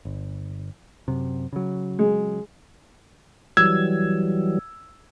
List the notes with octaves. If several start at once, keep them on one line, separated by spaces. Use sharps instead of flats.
G1
F#2 C3
C#3 F#3
G#3
E3 F#3 G3 E6 G#6